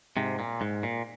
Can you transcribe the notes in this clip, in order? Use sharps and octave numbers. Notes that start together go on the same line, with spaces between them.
G#2 C3
A#2
G#2
A#2